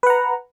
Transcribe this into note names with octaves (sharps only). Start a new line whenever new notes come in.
B4 F#5 A#5